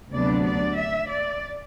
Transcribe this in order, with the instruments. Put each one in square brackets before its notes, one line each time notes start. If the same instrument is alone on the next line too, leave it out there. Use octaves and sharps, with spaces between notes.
[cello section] D2 C3 F#3 B3 D4 D5
D5
E5
D5